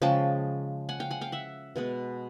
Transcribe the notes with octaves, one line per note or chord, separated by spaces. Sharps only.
C#3 F3 G#3 G5 A5
F#5 G#5
F5 G5
F#5 G#5
F5 G5
E5 F#5
B2 G#3 B3